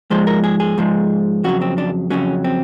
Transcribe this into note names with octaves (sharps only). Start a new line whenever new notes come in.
G#2 F3 G#3 C5
A#4
G#4
G#4
G#2 F3 G#3
F2 C#3 F#3 F#4
C4
D4
F2 C#3 F#3 C#4
C4